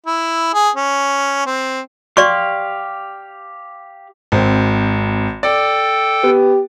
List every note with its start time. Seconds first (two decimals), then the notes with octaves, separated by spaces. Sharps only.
0.06 E4
0.54 G#4
0.76 C#4
1.46 C4
2.17 G4 D5 F5 C6 C#6
4.32 G#1 C4
5.43 A4 D5 G5
6.23 B3 G4